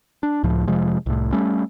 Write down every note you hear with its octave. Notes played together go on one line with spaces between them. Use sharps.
D4
C#2 A2 F3
F1 C3 F3 G#3
C2 A2
G3 A3 C#4